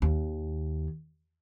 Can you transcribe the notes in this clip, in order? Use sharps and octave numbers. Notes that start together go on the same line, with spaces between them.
D#2